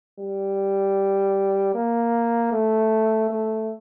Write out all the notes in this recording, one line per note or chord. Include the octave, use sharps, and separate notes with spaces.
G3
A#3
A3
A3